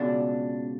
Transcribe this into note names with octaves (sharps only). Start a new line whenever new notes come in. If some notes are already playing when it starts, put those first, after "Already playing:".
Already playing: C#2 B2 D4